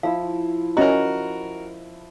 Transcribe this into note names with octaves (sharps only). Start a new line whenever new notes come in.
F3 E4 F5 E6
C#4 F#4 A#4 D#5 E5 A#5